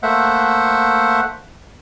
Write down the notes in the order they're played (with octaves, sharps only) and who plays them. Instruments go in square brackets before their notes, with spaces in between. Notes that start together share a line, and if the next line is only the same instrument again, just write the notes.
[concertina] A3 A#3 C5 E5 F#5